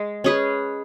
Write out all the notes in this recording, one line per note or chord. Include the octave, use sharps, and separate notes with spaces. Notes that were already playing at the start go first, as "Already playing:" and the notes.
Already playing: G#3
C#4 G#4 B4